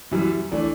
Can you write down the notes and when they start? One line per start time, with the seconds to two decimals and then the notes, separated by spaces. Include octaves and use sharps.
0.11 F#2 E3 G3
0.52 E3 A3 D4